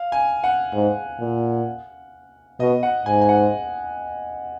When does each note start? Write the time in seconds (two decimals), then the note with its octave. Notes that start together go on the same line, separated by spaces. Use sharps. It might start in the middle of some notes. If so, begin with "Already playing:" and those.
Already playing: F5
0.12 G#5
0.44 F#5
0.73 G#2
1.20 A#2
2.60 B2 D#5
2.83 F#5
3.06 G#2 G#5
3.21 G#5
3.29 F#5